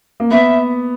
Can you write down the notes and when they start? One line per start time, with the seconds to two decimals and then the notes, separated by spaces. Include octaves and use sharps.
0.20 A#3
0.31 B3 E5